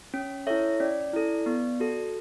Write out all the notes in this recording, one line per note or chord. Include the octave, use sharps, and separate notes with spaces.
C#4
E4 A4 C#5 E5
C#4 D5
E4 A4
B3
F#4 A4